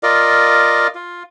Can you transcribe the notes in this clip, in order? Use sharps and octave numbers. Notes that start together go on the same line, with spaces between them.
F4 A#4 D5 D#5
F4